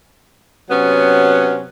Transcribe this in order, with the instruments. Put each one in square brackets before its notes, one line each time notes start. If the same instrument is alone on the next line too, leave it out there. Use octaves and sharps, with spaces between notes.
[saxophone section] C3 F#3 B3 C#4